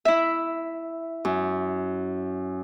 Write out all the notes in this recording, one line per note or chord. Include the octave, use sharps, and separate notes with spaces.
E4 E5
F#2